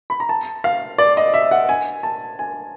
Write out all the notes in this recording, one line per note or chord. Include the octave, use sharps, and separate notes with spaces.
B5
A#5
A5
F5
D5
D#5
E5
F#5
G#5
A5
G#5